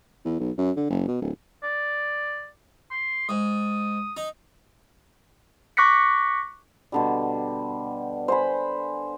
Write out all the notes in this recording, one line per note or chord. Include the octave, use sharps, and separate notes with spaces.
E2
B1
F#2
D3
F#1
B2
D1
D5
C6
G#2 D#6
D#4
C#6 D6 F#6 A#6 B6 C#7
B2 D3 G3
C5 G#5 B5